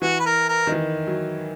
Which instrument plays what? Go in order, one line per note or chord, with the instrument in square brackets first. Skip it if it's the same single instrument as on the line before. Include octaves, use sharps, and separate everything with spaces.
[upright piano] E3 [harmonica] F#4
[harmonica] B4
A#4
A#4
[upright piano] D#3
E3
F#3